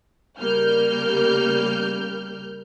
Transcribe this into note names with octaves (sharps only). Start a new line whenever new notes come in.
C#3 G3 A#3 F6 G6